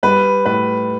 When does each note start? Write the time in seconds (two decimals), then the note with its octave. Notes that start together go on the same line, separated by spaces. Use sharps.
0.03 G3 B4
0.46 A2 B4